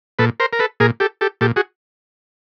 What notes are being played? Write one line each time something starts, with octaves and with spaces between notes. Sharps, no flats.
A#2 A4 B4
A#4 C5
A#4
A4 B4
A#2 G#4 A#4
G4 A4
G4 A4
A#2 G4 A4
F#4 G#4